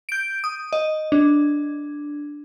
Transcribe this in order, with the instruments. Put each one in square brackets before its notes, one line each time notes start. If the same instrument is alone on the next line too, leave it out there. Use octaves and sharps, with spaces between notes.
[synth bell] G6 D7
D#6
D#5
D4